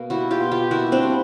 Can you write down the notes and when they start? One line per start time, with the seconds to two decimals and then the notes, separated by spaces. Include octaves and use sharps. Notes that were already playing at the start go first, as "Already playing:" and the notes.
Already playing: B2 A#3
0.10 G3 E4 F#4
0.31 F4 G4
0.41 B2
0.51 F4 G4
0.71 A#3 E4 F#4
0.92 C4 D4
1.03 G3